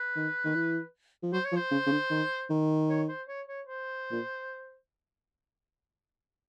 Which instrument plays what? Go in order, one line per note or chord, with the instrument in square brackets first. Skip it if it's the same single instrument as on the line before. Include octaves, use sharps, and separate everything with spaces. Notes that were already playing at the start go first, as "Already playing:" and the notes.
Already playing: [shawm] B4
[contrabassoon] D#3
D#3
E3
F3
[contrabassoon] F#3 [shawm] C5
[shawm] C#5
[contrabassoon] F3
[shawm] C5
[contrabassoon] C#3
C#3
D3
D#3
D#3
[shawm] C#5
C5
C#5
C#5
C5
[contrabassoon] A#2